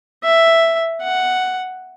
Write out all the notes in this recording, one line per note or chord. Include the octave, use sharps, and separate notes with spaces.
E5
F#5